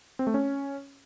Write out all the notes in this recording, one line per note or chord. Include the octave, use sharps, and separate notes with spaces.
C4
A3
C#4